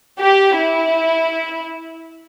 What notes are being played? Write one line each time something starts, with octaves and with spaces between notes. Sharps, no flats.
G4
E4